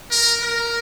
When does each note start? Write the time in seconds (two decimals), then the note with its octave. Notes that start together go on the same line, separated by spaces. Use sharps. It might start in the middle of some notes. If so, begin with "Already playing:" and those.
0.11 A#4
0.42 A#4